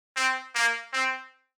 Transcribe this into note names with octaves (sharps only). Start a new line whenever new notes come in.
C4
A#3
C4